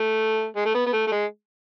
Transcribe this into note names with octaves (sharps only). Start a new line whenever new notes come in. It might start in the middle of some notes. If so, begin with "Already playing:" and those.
Already playing: A3
G#3
A3
B3
B3
A3
A3
G#3